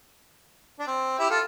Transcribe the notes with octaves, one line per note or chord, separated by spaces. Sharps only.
D4
C4
E4 G4
F4 A4